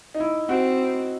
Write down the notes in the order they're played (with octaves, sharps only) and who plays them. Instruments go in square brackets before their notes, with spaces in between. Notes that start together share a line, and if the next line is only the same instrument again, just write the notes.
[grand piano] D#4
E4
[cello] C4 [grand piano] F#4